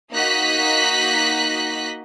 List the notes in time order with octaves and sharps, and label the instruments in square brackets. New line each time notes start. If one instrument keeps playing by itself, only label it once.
[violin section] A#3 D#4 F#4 D#5 F#6 B6